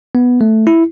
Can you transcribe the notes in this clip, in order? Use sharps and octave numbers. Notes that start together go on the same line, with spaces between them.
B3
A3
E4